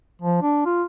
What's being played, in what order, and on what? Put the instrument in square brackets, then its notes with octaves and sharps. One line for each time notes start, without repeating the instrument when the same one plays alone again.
[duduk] F3
D4
F4